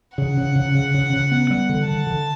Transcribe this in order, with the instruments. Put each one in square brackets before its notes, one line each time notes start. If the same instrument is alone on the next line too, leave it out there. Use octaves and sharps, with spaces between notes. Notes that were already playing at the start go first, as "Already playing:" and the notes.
[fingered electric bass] C#3 [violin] F#5
[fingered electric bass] C#3
C#3
C#3
C#3
C#3
B3
G3
D3
[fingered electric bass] D3 [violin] A5
[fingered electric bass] D3